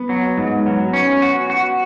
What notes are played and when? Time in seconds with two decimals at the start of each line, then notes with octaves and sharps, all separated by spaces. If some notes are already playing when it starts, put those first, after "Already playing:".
Already playing: B3
0.09 F#3
0.37 G#2
0.66 F#3 B3
0.93 C#4
1.22 F#4
1.50 F#4